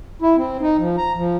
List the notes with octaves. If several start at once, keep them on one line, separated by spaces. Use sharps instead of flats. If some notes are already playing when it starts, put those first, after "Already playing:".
E4
C4
D#4
F3
A#5
F3